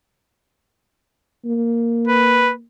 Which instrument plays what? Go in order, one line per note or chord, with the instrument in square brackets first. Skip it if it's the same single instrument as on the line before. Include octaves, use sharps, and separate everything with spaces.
[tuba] A#3
[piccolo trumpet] B4